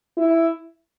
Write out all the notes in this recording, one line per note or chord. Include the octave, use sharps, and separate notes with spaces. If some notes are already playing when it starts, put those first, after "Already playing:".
E4